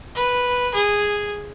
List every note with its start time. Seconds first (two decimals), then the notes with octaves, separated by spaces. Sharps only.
0.15 B4
0.75 G#4